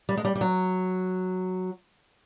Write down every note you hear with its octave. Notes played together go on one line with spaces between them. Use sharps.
G3
G#3
G3
G3
F#3